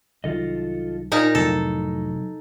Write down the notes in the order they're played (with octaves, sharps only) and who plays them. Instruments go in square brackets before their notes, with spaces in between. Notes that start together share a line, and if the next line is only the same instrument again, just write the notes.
[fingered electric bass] C2 D#3 F#3 [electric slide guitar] F4 A4 D#5
[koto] A#2 D#4 A#4
[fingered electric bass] F1 F2 A2 [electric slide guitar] C3 F#3 [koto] A4